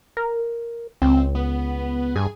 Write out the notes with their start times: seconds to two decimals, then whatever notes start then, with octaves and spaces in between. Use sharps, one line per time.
0.17 A#4
1.02 C#2 C4
1.35 B3
2.16 G2 G#4